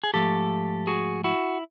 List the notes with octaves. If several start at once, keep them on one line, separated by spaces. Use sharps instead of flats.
G#4
G#2 F3 A3 G4 A4
F#4 G#4
E4 F#4